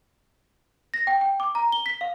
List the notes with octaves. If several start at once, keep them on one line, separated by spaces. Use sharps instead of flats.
A#6
G5
G5
D6
A#5
G7
B6
F5